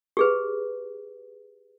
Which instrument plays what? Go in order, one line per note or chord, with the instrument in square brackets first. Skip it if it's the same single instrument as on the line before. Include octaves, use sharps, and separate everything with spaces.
[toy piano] G4 G#4 B4